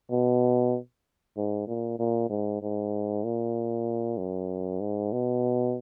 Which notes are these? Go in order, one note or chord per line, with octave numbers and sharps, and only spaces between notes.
B2
G#2
A#2
A#2
G#2
G#2
A#2
F#2
G#2
B2